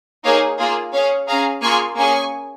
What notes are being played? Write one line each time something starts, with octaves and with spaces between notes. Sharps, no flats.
A#3 D#4 G#4 C#5 F5
A#3 F4 G#4
C#4 G#4 C#5 F5
C#4 G#4 F5 A#5
A#3 F4 G#4 G#5 C#6
A#3 C#4 G#4 G#5 C#6